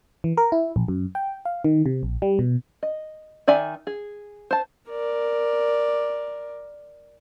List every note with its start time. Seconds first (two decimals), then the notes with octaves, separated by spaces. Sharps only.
0.24 E3
0.37 A#4
0.52 E4
0.76 A#1
0.88 F#2
1.15 G5
1.45 F5
1.64 D#3
1.86 C3
2.03 A#1
2.22 G3
2.39 B2
2.83 D#5
3.48 D#3 D5 E5 G#5
3.87 G#4
4.51 C5 A5
4.89 A#4 D5